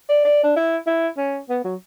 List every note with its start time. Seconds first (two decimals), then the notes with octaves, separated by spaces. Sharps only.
0.09 D5
0.25 D5
0.44 D4
0.56 E4
0.87 E4
1.17 C#4
1.49 B3
1.64 F#3